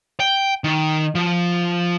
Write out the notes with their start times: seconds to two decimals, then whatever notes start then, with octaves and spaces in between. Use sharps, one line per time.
0.20 G5
0.64 D#3
1.15 F3